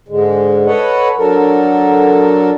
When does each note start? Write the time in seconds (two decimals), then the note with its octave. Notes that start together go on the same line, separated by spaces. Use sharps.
0.08 G#2 D3 G#3
0.66 A4 B4 C#5 D#5 F#5
1.17 D3 F#3 A4 A#4